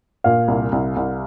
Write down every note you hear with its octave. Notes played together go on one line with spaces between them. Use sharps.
A#2 F5
C2
C2
C2